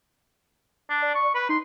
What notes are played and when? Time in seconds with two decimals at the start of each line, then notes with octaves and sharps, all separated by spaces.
0.90 D4
1.02 D5
1.15 C#6
1.35 B4 B5
1.49 D#4 C6